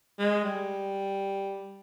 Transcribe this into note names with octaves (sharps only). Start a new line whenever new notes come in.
G#3
G3